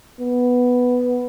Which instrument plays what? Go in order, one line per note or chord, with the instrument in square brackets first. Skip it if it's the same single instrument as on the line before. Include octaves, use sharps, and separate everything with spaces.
[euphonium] B3